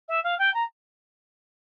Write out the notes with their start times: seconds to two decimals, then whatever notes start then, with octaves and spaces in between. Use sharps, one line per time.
0.08 E5
0.23 F5
0.38 G5
0.54 A#5